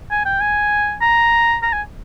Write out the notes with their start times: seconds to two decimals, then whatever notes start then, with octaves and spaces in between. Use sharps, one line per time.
0.11 G#5
0.26 G5
0.41 G#5
1.02 A#5
1.63 A#5
1.73 G#5